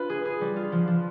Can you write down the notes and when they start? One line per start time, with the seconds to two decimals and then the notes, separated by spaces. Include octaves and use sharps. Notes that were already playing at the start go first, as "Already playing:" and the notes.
Already playing: D4 F4 B4
0.10 G#4
0.25 G#4
0.41 G3
0.56 F4
0.72 F3
0.88 F3